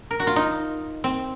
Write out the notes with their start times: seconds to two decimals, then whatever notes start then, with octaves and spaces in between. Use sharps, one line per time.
0.11 A#4
0.20 F#4
0.27 F4
0.36 D#4
1.04 C4